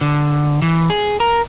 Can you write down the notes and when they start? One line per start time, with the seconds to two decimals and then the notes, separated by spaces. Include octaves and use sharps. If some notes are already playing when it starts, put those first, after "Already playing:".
0.01 D3
0.62 E3
0.90 G#4
1.20 A#4